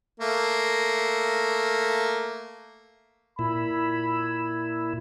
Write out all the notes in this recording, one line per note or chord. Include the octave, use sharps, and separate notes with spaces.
A3 A#3
A#2 E4 B5